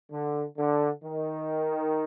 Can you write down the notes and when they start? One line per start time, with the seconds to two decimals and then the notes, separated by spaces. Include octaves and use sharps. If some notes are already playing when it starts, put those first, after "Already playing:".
0.12 D3
0.58 D3
1.04 D#3